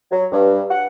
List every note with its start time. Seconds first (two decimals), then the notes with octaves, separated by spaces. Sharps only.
0.12 F#3
0.32 G2
0.70 F#5